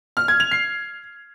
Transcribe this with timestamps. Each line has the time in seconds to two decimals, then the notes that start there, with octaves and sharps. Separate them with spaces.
0.17 F6
0.28 G#6
0.40 F7
0.51 C7